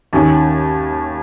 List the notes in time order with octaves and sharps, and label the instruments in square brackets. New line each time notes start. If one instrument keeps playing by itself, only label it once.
[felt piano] D#2 D#3 C#4